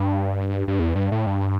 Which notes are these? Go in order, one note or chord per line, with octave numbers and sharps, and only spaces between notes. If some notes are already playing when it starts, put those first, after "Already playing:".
Already playing: G2
G2
E2
G2
A2
G2